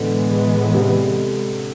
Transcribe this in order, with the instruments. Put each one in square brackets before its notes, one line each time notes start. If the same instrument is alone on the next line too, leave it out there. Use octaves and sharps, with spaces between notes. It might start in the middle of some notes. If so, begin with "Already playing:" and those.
Already playing: [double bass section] A2 E3 G#3 B3 [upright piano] D3
[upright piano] C3